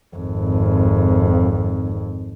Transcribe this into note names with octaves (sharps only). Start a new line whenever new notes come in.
G#1 F2